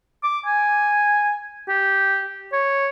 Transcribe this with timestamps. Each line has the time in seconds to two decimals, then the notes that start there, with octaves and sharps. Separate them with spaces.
0.24 D6
0.46 G#5
1.68 G4
2.53 C#5